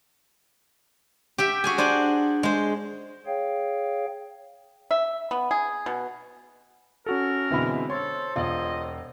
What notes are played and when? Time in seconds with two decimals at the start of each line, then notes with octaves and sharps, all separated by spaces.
1.38 G4 E5 G5
1.64 F#4 G#4 G#5
1.78 D4 C5 D5 G#5
2.43 G#3 C5
3.26 G#4 C#5 F5 G5
4.91 E5
5.31 B3
5.51 G#4
5.86 B2
7.06 C#4 F#4 A4 A#4
7.51 B2 D3 E3 G#3 C4 B5
7.90 A4 C5 C#5 C6
8.36 E1 F4 D#5